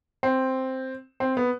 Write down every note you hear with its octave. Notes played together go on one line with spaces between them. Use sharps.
C4
C4
B3